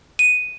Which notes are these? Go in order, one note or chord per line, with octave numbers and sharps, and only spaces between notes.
D#7